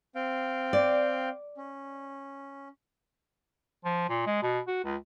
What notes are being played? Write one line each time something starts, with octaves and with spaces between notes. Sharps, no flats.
C4 F5 G5
D5
C#4
F3
A#2
G#3
B2
F#4
C#2